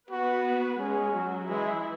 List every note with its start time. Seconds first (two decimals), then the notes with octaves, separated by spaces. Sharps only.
0.10 B3 F#4 B4
0.80 G#3 C#4 G#4
1.15 F#3 F#4
1.49 E3 G#3 E4